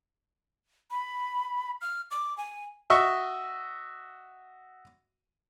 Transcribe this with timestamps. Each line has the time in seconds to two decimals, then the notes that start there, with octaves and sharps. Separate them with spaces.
0.91 B5
1.81 F6
2.11 D6
2.37 G#5
2.90 F#4 D#5 E5 C#6